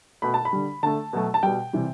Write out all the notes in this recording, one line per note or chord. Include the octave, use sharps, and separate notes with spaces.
B2 A3 B5
A5
B5
D3 G3
D3 A3 A5
B2 F#3 A3
A5
B2 G3 G5
C3 E3 G3